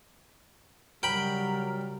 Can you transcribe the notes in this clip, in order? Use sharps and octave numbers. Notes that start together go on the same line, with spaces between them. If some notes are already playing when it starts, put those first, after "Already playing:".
C#3 F#3 G3 A#4 G5 B5